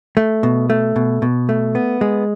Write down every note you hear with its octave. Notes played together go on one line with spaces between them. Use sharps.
A3
B2
A3
B2
B2
A3
B3
G#3